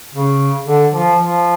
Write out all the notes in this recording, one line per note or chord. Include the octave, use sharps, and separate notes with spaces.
C#3
D3
F3
F3